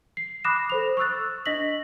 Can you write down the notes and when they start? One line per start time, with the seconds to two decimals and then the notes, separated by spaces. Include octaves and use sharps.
0.17 C7
0.44 B5 D6 D#6 F#6 A#6 E7
0.70 A4 C5 F7
0.97 C#6 D#6 E6 F#6 A6
1.46 D4 D#5 A#6 B6 F#7